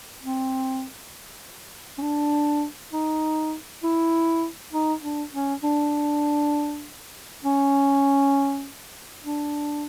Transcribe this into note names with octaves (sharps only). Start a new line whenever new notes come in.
C4
C#4
D4
D#4
E4
D#4
D4
C#4
D4
C#4
D4